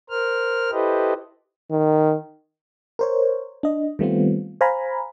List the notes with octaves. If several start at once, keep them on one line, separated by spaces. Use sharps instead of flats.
A#4 C5 F6
E4 G4 A4 B4 C5 D#5
D#3
A#4 C5 C#5
D4 D#5
D#3 G3 A3 B3 C4 F4
C5 F5 G#5 A#5 B5